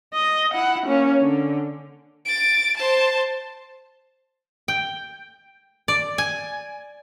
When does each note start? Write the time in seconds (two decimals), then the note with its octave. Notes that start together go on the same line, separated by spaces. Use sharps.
0.14 D#5
0.54 E4 F#5
0.86 A#3 C#4
1.22 D3
2.26 A6 D7
2.77 C5 A5
4.68 G5
5.88 D5
6.18 G#5